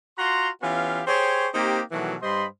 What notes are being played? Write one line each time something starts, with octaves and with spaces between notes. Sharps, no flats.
F4 F#4 F#5 A#5 C6
E3 B3 C#4 F4 G4 F5
G4 G#4 C5 C#5
A#3 C4 D#4 G4
B2 D#3 E3 F#3 G3 A3
G2 G3 C5 D#5 B5 C6